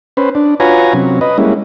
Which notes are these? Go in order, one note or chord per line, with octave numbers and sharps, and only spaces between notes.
C#4 B4 C5
D4
F4 F#4 B4 C#5 G#5 A#5
C3 F#3 C#4
B4 D#5
G3 G#3 A#3 C#4 E4